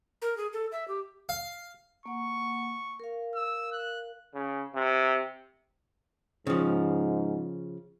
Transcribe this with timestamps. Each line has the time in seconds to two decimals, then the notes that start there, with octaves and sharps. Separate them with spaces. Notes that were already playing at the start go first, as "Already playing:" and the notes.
0.22 A#4
0.37 G#4
0.53 A4
0.72 E5
0.88 G4
1.29 F5
2.06 A#3 F#5 C#6
3.00 A#4 F5
3.35 E6
3.72 F#6
4.34 C#3
4.74 C3
6.47 G#2 C#3 F3